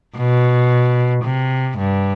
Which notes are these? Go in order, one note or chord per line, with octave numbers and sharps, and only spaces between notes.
B2
C3
G2